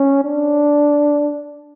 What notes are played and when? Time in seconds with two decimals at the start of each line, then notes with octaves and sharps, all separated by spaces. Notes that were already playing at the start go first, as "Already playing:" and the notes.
Already playing: C#4
0.24 D4